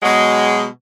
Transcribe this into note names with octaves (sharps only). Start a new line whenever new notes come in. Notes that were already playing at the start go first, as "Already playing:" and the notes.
B2 F#3 G#3